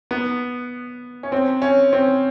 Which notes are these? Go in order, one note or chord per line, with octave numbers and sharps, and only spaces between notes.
B3
C#4
C4
C#4
C4